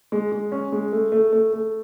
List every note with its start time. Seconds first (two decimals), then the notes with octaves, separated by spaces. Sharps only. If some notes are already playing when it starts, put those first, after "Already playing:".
0.12 G#3
0.32 G#3
0.52 C#4
0.72 G#3
0.92 A3
1.12 A3
1.33 A3
1.53 A3